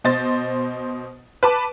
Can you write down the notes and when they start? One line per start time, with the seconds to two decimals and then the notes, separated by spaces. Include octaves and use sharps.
0.04 B2 C5 D#5 A6
1.43 B4 A5 D6